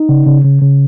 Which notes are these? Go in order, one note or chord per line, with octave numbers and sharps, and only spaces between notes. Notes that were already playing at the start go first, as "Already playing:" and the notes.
Already playing: D#4
C#3
C#3
C#3
C#3